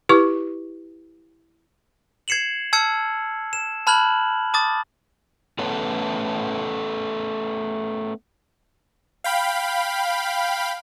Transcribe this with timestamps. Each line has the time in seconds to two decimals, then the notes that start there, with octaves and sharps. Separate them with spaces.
0.09 E4 G4 B4 C#6 D6
2.28 G#6 C7 C#7 E7 F#7
2.73 A5 E6 F6 G#6 C#7
3.53 E7
3.87 A5 B5 F6 F#6 G#6 F#7
4.54 A5 D6 D#6 A6
5.59 A3 B3 C#4 A4 B4 C#5
9.24 F5 G5 B5